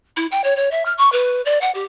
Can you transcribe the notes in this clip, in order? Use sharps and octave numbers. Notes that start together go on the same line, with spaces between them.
E4
G5
C#5
C#5
E5
F6
C#6
B4
D5
F#5
G4